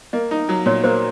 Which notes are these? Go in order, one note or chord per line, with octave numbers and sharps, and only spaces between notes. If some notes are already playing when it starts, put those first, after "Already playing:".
A#3 D#5
D#4
F#3
A#2 C#5
A#3 C5